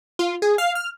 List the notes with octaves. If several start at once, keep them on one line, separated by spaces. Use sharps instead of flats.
F4
G#4
F5
F6